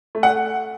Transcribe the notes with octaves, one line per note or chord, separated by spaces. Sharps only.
A3
F#5